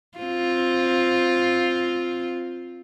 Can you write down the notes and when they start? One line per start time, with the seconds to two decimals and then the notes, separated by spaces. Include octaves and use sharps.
0.19 C4 F4